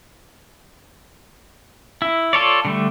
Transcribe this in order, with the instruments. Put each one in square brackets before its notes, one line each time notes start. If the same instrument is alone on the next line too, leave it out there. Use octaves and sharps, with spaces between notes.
[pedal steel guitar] E4
F4 A4 C#5 D5
D3 G3 A3